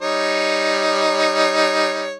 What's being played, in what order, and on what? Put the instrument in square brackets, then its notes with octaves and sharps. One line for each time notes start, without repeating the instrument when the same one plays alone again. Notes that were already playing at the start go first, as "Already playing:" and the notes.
[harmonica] G3 D#4 C#5